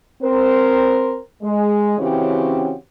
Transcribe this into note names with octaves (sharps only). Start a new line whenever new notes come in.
C4 A#4 C5
G#3
C#3 E3 C4 C#4 F#4 G4